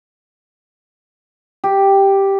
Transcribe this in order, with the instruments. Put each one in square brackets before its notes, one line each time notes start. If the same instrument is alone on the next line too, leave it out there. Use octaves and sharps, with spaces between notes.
[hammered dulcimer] G4